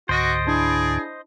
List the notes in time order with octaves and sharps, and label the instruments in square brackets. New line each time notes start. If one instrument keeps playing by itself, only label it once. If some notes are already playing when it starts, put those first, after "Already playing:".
[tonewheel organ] C#2 G#2 D3 [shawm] F#4 [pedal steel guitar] C5 D#5
[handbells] D4 E4 [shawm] G#4